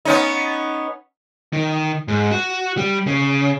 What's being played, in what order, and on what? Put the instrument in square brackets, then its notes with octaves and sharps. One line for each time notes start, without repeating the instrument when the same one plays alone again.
[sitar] B3 C#4 D#4
[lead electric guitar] D#3
G#2
F#4
G3
C#3